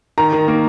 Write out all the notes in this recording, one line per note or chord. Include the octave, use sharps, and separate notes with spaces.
D#3 A#5
D#3
A#3